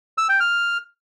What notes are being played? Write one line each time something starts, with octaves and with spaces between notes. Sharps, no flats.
E6
G5
F6